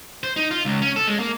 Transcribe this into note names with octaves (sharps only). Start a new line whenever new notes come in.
C5
D#4
F4
C#2
C#4
A4
G#3
A#3